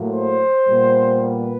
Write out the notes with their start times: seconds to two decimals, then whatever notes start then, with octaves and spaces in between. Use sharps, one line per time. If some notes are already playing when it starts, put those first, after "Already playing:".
Already playing: A2 F#3 A#3
0.10 C5
0.67 A#2 G3 B3
1.24 B4